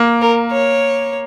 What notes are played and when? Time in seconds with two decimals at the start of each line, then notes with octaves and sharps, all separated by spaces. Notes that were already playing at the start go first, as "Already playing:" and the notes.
Already playing: A#3
0.21 A#4
0.51 C#5